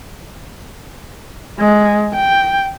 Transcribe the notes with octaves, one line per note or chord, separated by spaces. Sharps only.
G#3
G5